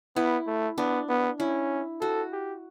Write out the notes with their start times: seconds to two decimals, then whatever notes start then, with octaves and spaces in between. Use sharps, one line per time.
0.16 B3 E4
0.47 A3
0.78 B3 D4
1.09 B3
1.40 C#4 E4
2.01 F#4 A4
2.33 G4